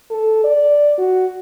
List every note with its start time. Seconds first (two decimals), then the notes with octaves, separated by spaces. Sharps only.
0.11 A4
0.44 D5
0.99 F#4